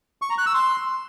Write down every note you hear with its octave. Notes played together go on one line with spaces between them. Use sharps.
C#6
A#5
F#6
E6
C6